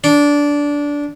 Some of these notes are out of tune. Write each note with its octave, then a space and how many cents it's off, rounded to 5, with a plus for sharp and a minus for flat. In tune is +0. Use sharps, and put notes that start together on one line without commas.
D4 -15